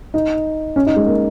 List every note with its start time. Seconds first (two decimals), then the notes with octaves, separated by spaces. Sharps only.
0.14 D#4
0.76 C#4
0.86 D#4
0.96 G#3
1.06 A#3